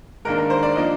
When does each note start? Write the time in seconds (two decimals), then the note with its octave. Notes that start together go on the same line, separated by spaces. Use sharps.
0.25 G#2 D#3 A#3 D4 A#4
0.38 A#4
0.50 C5
0.63 D5
0.76 F3 A#3 D4 D#5